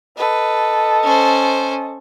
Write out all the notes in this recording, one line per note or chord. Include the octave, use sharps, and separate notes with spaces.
A4 B4 D#5
C#4 C5